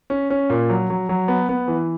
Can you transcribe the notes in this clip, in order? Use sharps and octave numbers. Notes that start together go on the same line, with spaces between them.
C#4
C#4
A#2
F#3
F#3
F#3
B3
B3
E3